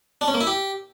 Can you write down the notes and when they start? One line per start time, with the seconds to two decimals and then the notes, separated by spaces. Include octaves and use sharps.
0.21 D4
0.28 C#4
0.34 A#3
0.41 E4
0.47 G4